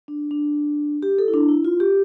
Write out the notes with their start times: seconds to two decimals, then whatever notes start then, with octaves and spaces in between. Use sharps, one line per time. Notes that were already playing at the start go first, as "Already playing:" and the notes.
0.08 D4
0.31 D4
1.03 G4
1.18 A4
1.28 E4
1.34 D4
1.49 E4
1.65 F4
1.80 G4